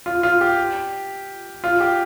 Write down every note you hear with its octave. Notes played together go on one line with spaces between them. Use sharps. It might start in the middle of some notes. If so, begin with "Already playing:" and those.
F4
F4
G4
F4
G4